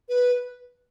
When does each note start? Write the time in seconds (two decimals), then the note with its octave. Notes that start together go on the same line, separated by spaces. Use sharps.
0.09 B4